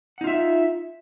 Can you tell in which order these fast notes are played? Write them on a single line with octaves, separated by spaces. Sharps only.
F#5 D#4 F4 E5